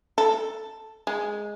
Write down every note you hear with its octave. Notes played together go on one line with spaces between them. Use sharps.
A4
G#3